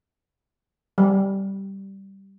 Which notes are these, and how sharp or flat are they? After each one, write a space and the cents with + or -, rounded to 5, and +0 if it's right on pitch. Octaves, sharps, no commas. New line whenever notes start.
G3 -10